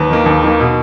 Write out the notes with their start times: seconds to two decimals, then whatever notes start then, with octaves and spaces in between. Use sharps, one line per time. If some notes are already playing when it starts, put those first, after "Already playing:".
Already playing: D#2 B4
0.10 D#3 A#3
0.26 D#2
0.43 D#3 A#3
0.60 B2